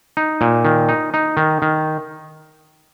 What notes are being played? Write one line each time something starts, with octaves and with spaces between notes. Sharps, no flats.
D#4
A#2
D#3
D#4
D#4
D#3
D#3